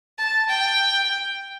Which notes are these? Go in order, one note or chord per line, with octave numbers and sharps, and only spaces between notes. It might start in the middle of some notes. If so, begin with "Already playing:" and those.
A5
G5